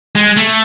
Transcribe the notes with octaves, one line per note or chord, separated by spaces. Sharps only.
G#3
A3